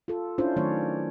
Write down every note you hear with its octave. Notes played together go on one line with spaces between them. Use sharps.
F4 A4
C#4 D4 E4 F4 C5
D#3 F#3 A3 C#4 C#5 D5